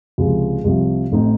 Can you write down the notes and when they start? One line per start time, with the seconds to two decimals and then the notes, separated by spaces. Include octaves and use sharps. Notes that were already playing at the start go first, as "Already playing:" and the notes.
0.18 C#2 C3 F3
0.64 C2 C3 F3
1.12 A1 A2 A3 C4 D#4